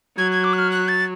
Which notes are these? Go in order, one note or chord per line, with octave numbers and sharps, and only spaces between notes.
F#3 G#6
G#6
D6
F#6
F6
F#6
A6